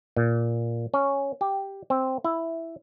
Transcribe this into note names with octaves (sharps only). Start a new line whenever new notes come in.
A#2
C#4
G4
C4
E4